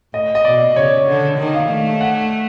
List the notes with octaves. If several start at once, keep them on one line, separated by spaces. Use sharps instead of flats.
A2 D#5
D#5
B2 D5
C#3 C#5
D3
D#3
F5
A3
F#5